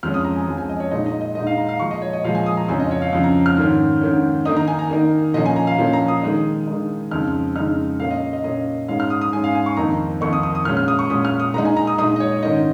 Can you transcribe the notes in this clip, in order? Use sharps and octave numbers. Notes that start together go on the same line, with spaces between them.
F2 F3 G#3 C#4 F6
D#6
A#5
G#5
F2 F3 G#3 C#4
G#5
D#5
C#5
A#2 G#3 D#4 D#5
D#5
D#5
A#2 G#3 D#4 D#5
F5
A#5
F5
A#2 F3 G#3 C#6
D#5
C#5
D#5
A#2 F3 G#3 F5
G#5
D#6
A#5
F2 C#3 F3 C#4 G#5
D#5
C#5
F5
F2 C#3 F3 C#4 F5
A#5
F6
G#2 D#3 C#4
G#2 D#3 C#4
D#3 A#3 D#4 D#6
A#5
G#5
A#5
D#3 A#3 D#4
A#2 F3 A#3 C#4 D#5
G#5
A#5
F5
A#2 F3 A#3 C#4
A#5
D#6
D#3 G#3 D#4
D#3 G#3 D#4
F2 C#3 G#3 D#4 F6
F2 C#3 G#3 D#4 F6
A#2 A#3 C#4 F5
D#5
D#5
A#2 A#3 C#4 D#5
G#2 G#3 C#4 F5
F6
D#6
D#6
G#2 G#3 C#4 G#5
F5
G#5
C#6
F2 D#3 A#3 D#4 A#5
F2 D#3 A#3 D#4 C#6
D#6
D#6
D#6
A#2 G#3 C#4 F6
F6
D#6
C#6
A#2 G#3 C#4 D#6
F6
D#6
A#2 G#3 D#4 A#5
G#5
A#5
D#6
A#2 G#3 D#4 D#6
D#5
C#5
G#2 D#3 C#4 D#5